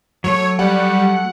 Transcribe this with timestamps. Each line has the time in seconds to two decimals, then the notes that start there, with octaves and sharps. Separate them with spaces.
0.24 F#3 A3 C#5 C#6
0.59 G3 F#5